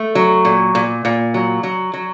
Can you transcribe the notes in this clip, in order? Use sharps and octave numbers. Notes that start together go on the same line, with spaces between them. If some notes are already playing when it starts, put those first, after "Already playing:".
Already playing: A3
F#3
A#2
A#2
A#2
F#3
F#3
F#3